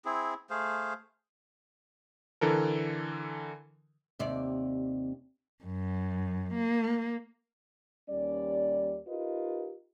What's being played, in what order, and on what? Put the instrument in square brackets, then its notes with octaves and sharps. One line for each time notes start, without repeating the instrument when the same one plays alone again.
[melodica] C4 E4 G#4
A3 G#4 C5 F5
[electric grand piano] D3 E3 A4 A#4
[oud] D#2 C3 D5
[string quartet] F#2
A#3
[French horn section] D#2 G3 C#4 D5
D#4 F4 G4 A#4 B4 D#5